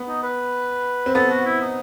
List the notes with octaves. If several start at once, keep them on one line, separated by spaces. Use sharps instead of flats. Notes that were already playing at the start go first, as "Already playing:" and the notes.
Already playing: B3
D#4
B4
C4
B3 A4
F#4
E4
D#4